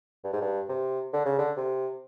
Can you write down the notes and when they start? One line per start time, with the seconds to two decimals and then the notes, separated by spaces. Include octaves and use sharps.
0.24 G2
0.33 G#2
0.41 G2
0.69 C3
1.13 D3
1.25 C#3
1.38 D3
1.57 C3